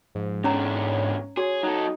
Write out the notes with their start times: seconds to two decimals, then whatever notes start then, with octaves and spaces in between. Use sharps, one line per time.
0.15 G#2 F3
0.44 E2 D3 C#4 C#5 A#5
1.37 F#4 G#4 C#5
1.63 F#3 D#4 A4